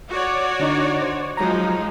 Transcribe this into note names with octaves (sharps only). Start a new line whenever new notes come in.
F#4 C#5 D5
D3 D4 D#4
C5
F3 F#3 G#3 D#4 A#5